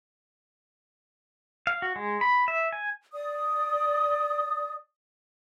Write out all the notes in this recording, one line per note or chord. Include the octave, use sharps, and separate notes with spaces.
F5
F#4
G#3
B5
E5
G#5
D5 D#6